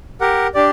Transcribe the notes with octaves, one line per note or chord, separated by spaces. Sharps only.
G4 A#4 F#5
D4 G4 D5